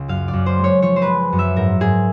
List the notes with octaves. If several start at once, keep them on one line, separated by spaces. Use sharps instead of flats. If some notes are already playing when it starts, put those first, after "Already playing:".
Already playing: C#2
F#2 F5
D5
F#2
C5
G#3 C#5
F3 C#5
C5
B4
G#3
F#2
E5
G#2 A#4
G#2 G#4